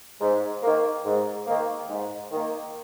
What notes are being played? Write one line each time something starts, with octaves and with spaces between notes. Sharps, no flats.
G#2
D#3 A#3
G#2
D#3 A#3
G#2
D#3 A#3